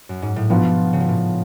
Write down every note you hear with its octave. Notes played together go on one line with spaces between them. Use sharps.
F#2
G#2
A2
G#2 B2 F3 B3 F4 B4
C#3
B2
A2 C#3